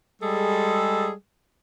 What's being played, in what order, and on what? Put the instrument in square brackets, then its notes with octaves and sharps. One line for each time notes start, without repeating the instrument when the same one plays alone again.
[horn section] G3 G#3 G#4 A4